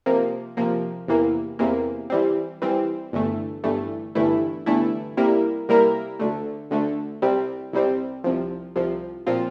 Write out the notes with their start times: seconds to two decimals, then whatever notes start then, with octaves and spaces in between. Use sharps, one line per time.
0.06 C3 F3 A#3
0.57 C3 F3 A#3
1.08 E2 C3 E3 A#3
1.59 E2 C3 E3 A#3
2.10 E3 G3 C4
2.62 E3 G3 C4
3.12 G1 G2 E3 A3
3.64 G1 G2 E3 A3
4.15 G1 G2 E3 A3 E4
4.66 G1 G2 E3 A3 E4
5.17 C3 G3 A#3 E4 A#4
5.69 C3 G3 A#3 E4 A#4
6.20 D2 D3 A3
6.71 D2 D3 A3
7.22 C2 C3 G3 C4
7.73 C2 C3 G3 C4
8.24 C2 C3 F3
8.76 C2 C3 F3
9.27 A#2 F3 C4 F4